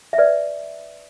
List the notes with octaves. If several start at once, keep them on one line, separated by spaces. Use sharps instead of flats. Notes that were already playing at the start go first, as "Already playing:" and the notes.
E5
B4 D5